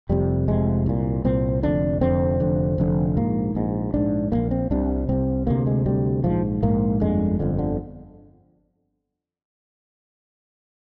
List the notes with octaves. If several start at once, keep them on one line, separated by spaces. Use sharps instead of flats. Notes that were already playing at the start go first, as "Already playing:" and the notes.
F1 F2 C3 G3
F1 F2 C3 G#3
C2 A#2
C2 A#2 C4
F1 F2 D3 D4
F1 F2 D3 C4
F1 F2 D3
F1 F2 D3
A#1 G#2 A#3
A#1 G#2
A#1 G#2 D4
A#1 G#2 A#3
C4
C2 C3 D4
C2 C3 C4
D2 C3 A#3
G#3
D2 C3 G3
A#1 G#2 F3
A#1 G#2 A#3
G1 F2 D3 G#3
G1 F2 D3
D3